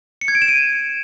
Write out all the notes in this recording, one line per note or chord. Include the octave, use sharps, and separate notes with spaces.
C#7
G#6
D7
E7
D#7